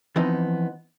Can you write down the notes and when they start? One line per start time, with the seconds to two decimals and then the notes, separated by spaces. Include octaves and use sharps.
0.16 E3 F3 B3 C4 D#4